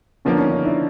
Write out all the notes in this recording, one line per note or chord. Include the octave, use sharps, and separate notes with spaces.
D3 F3 A#3 B3 C#4
D4
C#4 D#4
C#4 D#4
D4 E4